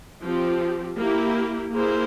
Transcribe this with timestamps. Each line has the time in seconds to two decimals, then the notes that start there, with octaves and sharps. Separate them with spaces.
0.22 F3 C4 G4
0.98 A#3 E4 G4
1.73 A#3 E4 G#4 C5